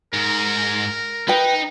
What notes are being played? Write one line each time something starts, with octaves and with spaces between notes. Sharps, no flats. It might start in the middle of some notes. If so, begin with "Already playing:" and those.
G#2 A#4
D#4 B4 G5